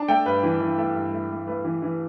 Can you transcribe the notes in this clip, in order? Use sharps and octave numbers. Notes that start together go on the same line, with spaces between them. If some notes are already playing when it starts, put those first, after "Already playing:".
Already playing: D4 A5
A3 G5
G2 B4
E3
E3
A3
G2
A3
A3
A3 B4
E3
E3